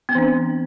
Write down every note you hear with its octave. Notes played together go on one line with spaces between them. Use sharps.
E3 B3 C4 D4